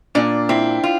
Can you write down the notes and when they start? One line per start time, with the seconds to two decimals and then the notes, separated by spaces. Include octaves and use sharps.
0.15 A#2 D4
0.49 C4 E4
0.84 F4